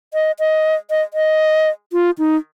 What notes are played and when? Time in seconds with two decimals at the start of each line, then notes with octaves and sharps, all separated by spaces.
0.14 D#5
0.39 D#5
0.90 D#5
1.14 D#5
1.93 F4
2.18 D#4